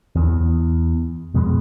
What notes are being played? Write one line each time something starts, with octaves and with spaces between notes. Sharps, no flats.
E2
F2 B2 G#3